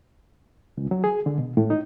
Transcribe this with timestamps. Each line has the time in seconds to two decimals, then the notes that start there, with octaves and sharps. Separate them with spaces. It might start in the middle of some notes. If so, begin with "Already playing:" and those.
0.77 C#2
0.91 F#3
1.04 G#4
1.26 D3
1.38 B2
1.57 A2
1.70 D#4